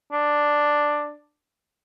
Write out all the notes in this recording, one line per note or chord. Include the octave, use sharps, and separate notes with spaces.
D4